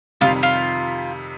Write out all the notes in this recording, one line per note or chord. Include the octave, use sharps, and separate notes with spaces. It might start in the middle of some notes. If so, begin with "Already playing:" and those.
F2 C3 D#3 G3 F4
F4